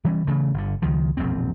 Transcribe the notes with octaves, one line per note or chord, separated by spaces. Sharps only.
E3 G3 A3 C#4
C#3 E3 A3
G1 D3
C#2 D#3 F3
E1 A#1 F#2 C4